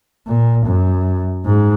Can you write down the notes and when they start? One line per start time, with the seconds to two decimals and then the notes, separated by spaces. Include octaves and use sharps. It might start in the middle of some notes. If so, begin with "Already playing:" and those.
0.27 A#2
0.66 F#2
1.45 G#2